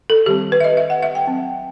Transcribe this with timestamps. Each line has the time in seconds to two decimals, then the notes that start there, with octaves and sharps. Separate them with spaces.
0.10 A4
0.26 D#3 G3 C4 G4
0.52 B4
0.60 E5
0.64 D#5
0.77 E5
0.90 F#5
1.03 E5
1.15 G5
1.27 F#3 C4